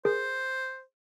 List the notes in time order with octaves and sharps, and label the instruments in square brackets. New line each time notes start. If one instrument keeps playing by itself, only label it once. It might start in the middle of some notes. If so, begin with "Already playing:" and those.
[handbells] G#4 A#4 [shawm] C5